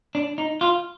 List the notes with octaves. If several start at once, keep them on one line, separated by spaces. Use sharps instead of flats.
D4
D#4
F4